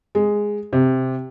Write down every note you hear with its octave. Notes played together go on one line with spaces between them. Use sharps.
G#3
C3